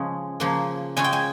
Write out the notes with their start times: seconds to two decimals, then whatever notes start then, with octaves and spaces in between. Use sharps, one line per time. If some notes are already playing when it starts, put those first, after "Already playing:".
Already playing: C#3 F3 G#3 C#4 A#5
0.40 C#3 F3 A#3
0.97 C#3 G#3 C#4 G#5
1.04 G5
1.13 G#5